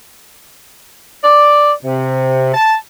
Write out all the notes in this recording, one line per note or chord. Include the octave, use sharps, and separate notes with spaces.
D5
C3
A5